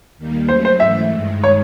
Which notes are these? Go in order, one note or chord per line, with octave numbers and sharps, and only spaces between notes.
D#2 D#3 G3 A#3
F#3 A3 C#4 C5
C5
G#2 E3 A3 E5
G2 D#3 G#3
C#5